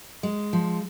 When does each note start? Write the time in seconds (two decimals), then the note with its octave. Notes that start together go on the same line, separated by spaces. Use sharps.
0.23 G#3
0.53 F3